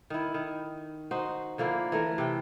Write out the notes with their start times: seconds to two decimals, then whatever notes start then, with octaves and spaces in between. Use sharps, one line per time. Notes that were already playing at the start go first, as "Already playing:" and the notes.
0.10 D#3 E4
0.34 D#3
1.11 D#4 F#4 C5
1.58 D3 F3 A#3 E4
1.92 E3 A3 A#4
2.18 C3 G5